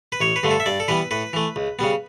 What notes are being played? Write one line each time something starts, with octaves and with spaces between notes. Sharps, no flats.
B4
A1 C#5
B4
G2 D3 A3
A4
E5
G2 D5
A4
E3 G3 B3 B4
A2 B4
E3 A3
C#2
C#3 G3 B3